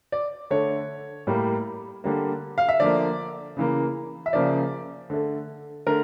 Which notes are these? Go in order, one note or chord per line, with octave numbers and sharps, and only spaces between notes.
D5
D3 A3 C#5
A2 G3 A#3
D3 G3 A#3
F5
E5
D3 F3 A#3 D5
C#3 E3 A#3
E5
C#3 F3 A#3 D5
D3 A3
D3 A3 A#4